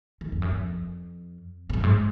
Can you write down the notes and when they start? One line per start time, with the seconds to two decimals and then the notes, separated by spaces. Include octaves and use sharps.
0.21 D#3
0.32 F2
0.42 F#2
0.52 F2
1.70 G#2
1.73 F#2
1.83 G#2